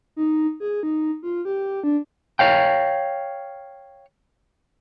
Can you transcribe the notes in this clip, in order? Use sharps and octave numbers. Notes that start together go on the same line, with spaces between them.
D#4
G#4
D#4
F4
G4
D4
C#5 F5 G5